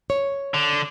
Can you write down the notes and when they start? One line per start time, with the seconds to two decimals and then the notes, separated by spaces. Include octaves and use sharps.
0.10 C#5
0.54 D3
0.73 D4